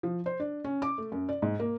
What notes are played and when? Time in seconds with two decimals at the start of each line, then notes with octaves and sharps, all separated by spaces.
0.03 F3
0.26 C5
0.40 D4
0.64 C#4
0.82 D6
0.98 A3
1.12 F#2
1.29 D5
1.42 G#2
1.60 A#3